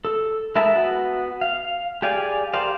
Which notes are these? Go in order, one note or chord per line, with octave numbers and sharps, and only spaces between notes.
A4
G#3 E4 A#4 E5 A5
B3 F#4
F5
G4 G#4 D5 F5 G#5
G4 A#4 C5 D5 F5